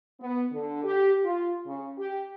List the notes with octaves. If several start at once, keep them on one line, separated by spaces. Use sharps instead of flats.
B3
D3
G4
F4
C#3
G4